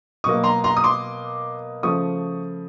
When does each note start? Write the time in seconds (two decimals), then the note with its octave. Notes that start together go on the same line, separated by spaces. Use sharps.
0.24 B2 F#3 A#3 C#6 D#6
0.44 A#5 C6
0.64 A#5 C6
0.77 D#6
0.84 C6 D6
1.83 C#3 F3 A3 C#6 D#6